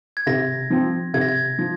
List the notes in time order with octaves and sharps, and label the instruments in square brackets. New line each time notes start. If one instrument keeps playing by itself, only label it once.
[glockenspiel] G#6
[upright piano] C3 [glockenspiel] A#6
[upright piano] F3 C4
[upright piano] C3 [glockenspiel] G#6
[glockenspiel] A#6
G#6
[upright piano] F3